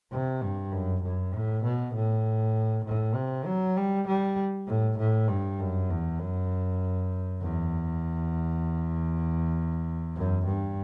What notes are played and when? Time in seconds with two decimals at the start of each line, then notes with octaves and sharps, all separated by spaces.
0.11 C3
0.41 G2
0.72 F#2
1.02 F#2
1.32 A2
1.64 B2
1.94 A2
2.85 A2
3.15 C3
3.45 F#3
3.77 G3
4.07 G3
4.67 A2
4.98 A2
5.28 G2
5.59 F#2
5.89 E2
6.20 F#2
7.41 E2
10.15 F#2
10.45 G2